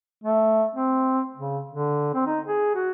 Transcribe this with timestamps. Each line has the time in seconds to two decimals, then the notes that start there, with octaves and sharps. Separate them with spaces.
0.24 A3
0.75 C4
1.37 C#3
1.71 D3
2.14 C4
2.27 D#4
2.47 G#4
2.75 F#4